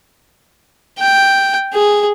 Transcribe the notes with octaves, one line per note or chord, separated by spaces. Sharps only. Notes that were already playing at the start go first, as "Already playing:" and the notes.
G5
G#4